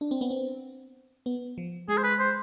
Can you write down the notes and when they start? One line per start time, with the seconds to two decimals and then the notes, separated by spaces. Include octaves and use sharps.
0.01 D4
0.11 C4
0.21 B3
0.31 C4
1.26 B3
1.58 F3
1.88 G#3 G#4
1.98 C5
2.03 B4
2.19 C5